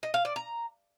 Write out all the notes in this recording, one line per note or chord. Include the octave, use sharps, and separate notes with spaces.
D#5
F5
D5
A#5